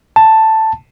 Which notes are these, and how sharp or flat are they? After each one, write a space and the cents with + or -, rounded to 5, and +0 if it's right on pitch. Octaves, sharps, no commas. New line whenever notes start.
A5 +5